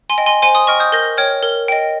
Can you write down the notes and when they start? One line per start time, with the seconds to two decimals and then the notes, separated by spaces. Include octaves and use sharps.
0.10 G#5 C6
0.18 D#5 G5
0.26 G#5 C6
0.42 C5 G#5 C6
0.55 C6 D#6
0.67 D#5 G5 C#6 F6
0.80 D#6 G6
0.92 A#4 G6 A#6
1.18 C#5 G5 F6 G#6
1.43 A#4
1.68 D#5 G5